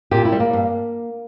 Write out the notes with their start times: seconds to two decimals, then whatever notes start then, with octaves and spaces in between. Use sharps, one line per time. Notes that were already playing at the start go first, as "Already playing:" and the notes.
0.11 A#2 G4
0.25 E4
0.32 G3
0.40 A#3
0.53 G2